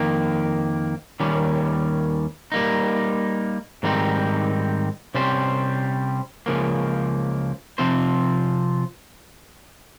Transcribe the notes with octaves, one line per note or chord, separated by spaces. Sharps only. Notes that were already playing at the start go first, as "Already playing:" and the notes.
Already playing: F2 D#3 A#3
D#2 D#3 G3 C#4
G3 A#3 D#4
G#2 D#3 G3 C4 D#4
C3 G3 C#4 G4 C5
C#2 C#3 F3 A#3
C3 F3 C4 F4 C5